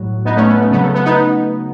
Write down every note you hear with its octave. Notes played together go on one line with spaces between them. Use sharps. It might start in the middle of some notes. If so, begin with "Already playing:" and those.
Already playing: A2 F#3 F#4
B3 D#4
A3 C#4
B3
A3
C#3 F#3 B3
A3
B3
B3 D#4